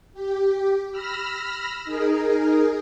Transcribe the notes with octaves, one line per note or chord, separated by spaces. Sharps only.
G4
B5 E6 F6 A#6
D#4 G#4 A#4